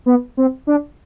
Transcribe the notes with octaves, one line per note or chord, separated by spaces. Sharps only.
B3
C4
D4